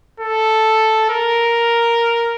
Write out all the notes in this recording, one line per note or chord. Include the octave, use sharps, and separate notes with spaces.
A4
A#4